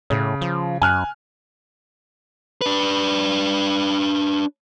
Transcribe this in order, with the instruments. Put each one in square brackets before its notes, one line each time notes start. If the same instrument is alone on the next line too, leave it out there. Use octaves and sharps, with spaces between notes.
[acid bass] A2 [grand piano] C#3
[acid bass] F3
[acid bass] F#2 [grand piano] G#5 F6 F#6
[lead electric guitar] D4 B4